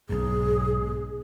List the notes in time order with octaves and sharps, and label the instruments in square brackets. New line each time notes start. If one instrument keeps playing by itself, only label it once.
[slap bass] B1 G#2 [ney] G#4